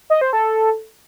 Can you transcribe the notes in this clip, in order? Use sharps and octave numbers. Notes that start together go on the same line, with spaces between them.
D#5
C5
A4